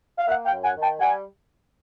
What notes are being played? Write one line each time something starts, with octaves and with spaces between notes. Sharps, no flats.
F5
A#3 E5 F#5
F5 G5
F#2
F#5 G#5
D#3
G5 A5
G3 F#5 G#5